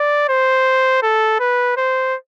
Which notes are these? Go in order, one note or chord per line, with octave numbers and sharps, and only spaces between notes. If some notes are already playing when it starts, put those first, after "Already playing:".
Already playing: D5
C5
A4
B4
C5